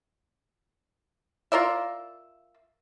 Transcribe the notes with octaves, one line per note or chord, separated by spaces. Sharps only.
F4 A#4 D5 E5